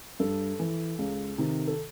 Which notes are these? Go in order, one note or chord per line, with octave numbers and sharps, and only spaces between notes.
G2 A4
E3
C#2
C3 D#3
A4